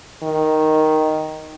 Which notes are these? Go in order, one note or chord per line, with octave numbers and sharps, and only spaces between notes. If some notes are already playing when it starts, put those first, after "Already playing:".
D#3